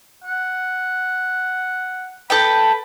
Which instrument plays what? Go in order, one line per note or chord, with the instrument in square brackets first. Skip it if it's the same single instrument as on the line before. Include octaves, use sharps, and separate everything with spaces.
[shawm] F#5
[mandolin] A4 B4 G5 [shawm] B5